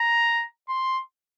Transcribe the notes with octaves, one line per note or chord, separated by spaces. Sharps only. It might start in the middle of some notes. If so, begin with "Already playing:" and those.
Already playing: A#5
C6